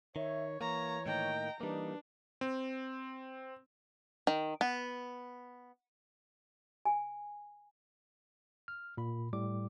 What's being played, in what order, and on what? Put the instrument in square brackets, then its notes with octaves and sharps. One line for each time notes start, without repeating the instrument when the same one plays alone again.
[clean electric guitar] D#3 [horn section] C#5 [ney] E5
[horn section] E3 C#5 [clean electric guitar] A#3 [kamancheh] A#5 [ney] C#6
[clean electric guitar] A2 D#3 A#3 [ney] D#5 [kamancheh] G5 A#5
[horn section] E3 D#4 [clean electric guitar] G3 A#3 [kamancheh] D4 [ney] B4
[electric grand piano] C4
[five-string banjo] D#3
B3
[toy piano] G#5
[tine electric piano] F6
A#2 B5
A2 G3 D6